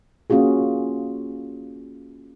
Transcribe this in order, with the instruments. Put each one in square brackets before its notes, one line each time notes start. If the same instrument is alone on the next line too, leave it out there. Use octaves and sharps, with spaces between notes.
[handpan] A#3 C#4 F4 F#4 G#4